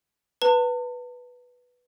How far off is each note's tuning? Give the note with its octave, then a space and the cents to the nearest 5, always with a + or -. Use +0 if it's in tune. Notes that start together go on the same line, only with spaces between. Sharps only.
B4 -5 A5 +40